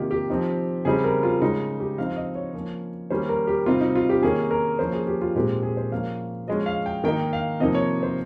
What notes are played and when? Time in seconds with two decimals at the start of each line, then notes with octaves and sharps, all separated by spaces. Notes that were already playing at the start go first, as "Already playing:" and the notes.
Already playing: C3 D#3 A#3 D#4 F4 G4
0.11 G4
0.30 F3 C4 D#4
0.85 C#3 G3 C4 D#4 G#4
1.04 A#4
1.23 F4
1.42 C#3 G#3 D#4
1.80 G4
1.97 F3 C4 D#4 F5
2.17 D#5
2.35 C#5
2.54 F3 A#3 C#4
3.10 D#3 G3 A#3 C#4 C5
3.29 A#4
3.47 G4
3.66 C3 G3 C4 D#4 F4
3.81 D#4
3.95 F4
4.09 G4
4.22 D#3 A#3 C#4 G#4
4.51 A#4
4.79 F3 A#3 C#4 C5
4.93 G#4
5.07 G4
5.22 F4
5.35 A#2 G#3 C4 D#4 G4
5.63 G#4
5.77 C5
5.92 F3 A#3 C#4 F5
6.47 F3 G#3 C#4 D#5
6.66 F5
6.86 G5
7.04 D#3 A#3 D#4 G5
7.33 F5
7.60 C3 F3 A#3 D#4 D#5
7.75 C#5
8.03 C5